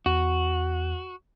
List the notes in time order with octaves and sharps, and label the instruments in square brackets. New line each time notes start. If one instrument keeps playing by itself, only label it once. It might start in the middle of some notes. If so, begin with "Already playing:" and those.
[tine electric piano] E2 [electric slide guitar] F#4